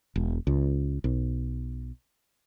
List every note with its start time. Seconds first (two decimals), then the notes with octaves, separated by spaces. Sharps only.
0.16 E1
0.47 C#2
1.04 B1